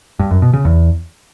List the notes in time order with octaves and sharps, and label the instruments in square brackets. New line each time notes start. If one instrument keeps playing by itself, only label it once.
[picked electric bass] G2
F#2
B2
C#3
E2